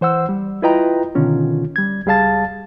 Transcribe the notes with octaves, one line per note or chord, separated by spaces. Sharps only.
E3 C5 F#5 E6
G3
E4 F4 B4 D#5 G5 A#5
B2 D3 D#3 C#4 F4
G3 G#6
C#2 G3 G#4 F5 A5 A6